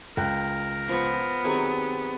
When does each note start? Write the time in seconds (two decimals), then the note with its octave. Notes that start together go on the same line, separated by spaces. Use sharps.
0.17 C#2 A#4 G5 F#6
0.89 F3 B3 C#6
1.44 D#3 F#3 C4 G4 G#4 G#5